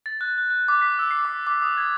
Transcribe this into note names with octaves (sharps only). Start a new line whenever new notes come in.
A6
F#6
F#6
F#6
D6
B6
E6
C7
D6
D6
D#6
G#6